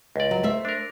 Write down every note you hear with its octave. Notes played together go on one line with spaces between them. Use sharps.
C#2 D5
F#3
A3 C5 E5
D4 A#4